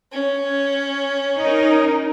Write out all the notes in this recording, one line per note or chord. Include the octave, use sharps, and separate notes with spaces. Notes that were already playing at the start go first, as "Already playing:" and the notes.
C#4
D#4 A#4